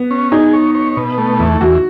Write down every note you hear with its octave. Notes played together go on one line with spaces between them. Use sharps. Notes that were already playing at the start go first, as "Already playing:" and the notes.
Already playing: B3
C#4
D#4 G#4
C#5
C#5
B2
A3
E2
E2 F#4